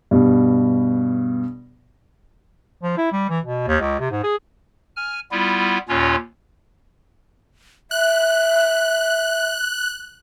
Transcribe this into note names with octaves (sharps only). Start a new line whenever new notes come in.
G2 B2
F3
E4
G3
E3
B2
D#2
C#2
C3
G#2
G#4
G#5 F6
G3 B3 E4 F4
D#2 A#2 C#4 F4 C#5
E5 F#6